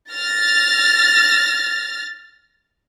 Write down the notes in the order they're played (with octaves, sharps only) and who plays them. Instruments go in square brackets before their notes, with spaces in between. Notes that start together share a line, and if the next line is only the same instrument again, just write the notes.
[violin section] F6 A6 A#6